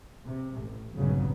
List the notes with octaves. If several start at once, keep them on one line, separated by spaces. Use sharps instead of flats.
C3
A1
F1 A#1 G2 C#3 F#3 B3